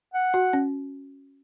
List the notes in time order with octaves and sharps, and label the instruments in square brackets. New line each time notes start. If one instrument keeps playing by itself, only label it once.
[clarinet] F#5
[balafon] F#4
C#4